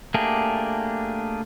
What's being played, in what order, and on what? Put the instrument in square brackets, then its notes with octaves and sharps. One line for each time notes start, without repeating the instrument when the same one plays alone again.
[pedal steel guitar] A3 A#3 D4 G4 G#4